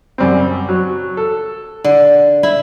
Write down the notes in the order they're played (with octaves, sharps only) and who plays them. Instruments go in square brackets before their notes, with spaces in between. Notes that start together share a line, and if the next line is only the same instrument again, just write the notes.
[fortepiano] F#2 G3 C4
F#3
A4
[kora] D3
E4